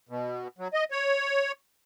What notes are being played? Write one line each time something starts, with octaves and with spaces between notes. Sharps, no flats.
B2
F#3
D#5
C#5